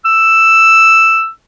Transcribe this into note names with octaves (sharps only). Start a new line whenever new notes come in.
E6